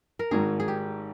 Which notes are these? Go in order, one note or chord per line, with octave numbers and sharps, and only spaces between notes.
A#4
G#1 G#2 D#3 G#4
G#4
G4